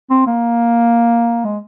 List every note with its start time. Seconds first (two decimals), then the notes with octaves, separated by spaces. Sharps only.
0.10 C4
0.27 A#3
1.45 G#3